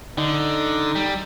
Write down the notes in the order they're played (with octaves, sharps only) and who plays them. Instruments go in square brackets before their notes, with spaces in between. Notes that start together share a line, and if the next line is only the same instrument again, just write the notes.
[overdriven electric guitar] D3 [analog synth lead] D#4
[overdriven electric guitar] G3